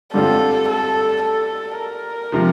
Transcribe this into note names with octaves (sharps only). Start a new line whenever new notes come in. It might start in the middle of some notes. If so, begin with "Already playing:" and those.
G2 D3 G3 C4 F4 A4
A4
A4
A#4
C3 F3